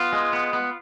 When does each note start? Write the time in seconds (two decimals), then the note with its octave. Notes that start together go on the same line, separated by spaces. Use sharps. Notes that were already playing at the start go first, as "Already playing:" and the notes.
Already playing: B3 F4
0.13 G#3
0.33 B3
0.53 B3